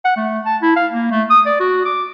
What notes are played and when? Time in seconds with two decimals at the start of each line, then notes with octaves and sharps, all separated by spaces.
0.05 F#5
0.17 A3
0.46 A5
0.62 E4
0.76 F5
0.93 A#3
1.11 A3
1.30 D#6
1.46 D5
1.60 F#4
1.85 D6